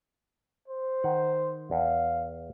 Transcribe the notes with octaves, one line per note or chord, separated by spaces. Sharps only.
C5
D#3 F#5
E2 F5